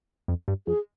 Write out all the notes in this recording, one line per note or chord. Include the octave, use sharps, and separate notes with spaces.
F2
G2
F2 G#4